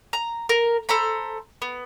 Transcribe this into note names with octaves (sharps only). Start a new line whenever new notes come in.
A#5
A#4
A4 C5 A#5 B5
B3